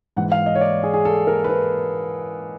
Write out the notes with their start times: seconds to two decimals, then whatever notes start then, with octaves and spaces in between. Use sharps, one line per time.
0.17 G#2 E3 F#5
0.32 F5
0.46 D#5
0.55 C#5
0.61 D5
0.83 G#4
0.94 G#4
1.05 A4
1.27 A#4
1.44 B4
1.49 A#4